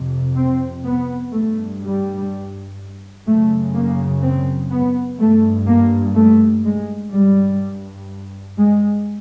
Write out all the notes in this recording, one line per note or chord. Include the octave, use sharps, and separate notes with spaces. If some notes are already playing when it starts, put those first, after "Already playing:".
Already playing: F2 C3
C4
B3
G2 A3
G3
F#2 C#3 A3
A#3
C4
B3
G2 A3
A#3
A3
G#3
G2 G3
G#3